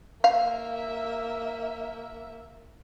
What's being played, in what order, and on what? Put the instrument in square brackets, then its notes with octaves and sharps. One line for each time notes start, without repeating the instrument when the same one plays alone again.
[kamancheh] A#3 E5 [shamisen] F5